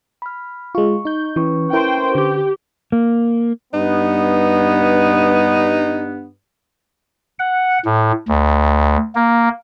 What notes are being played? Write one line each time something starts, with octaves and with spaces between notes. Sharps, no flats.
B5 F6
G#3 F4 C#6
D#4 G6
E3 C#4 B4 C#6
E4 A#4 C5 G5
D3 G4 G6
A#3
G2 B3 D#4
F#5
A2
D2
A#3